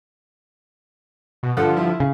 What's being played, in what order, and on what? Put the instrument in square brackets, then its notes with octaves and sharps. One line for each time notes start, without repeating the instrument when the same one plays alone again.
[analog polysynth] B2
[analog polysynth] G2 D3 F3 [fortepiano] A4 F#5
[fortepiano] E4
[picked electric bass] C#3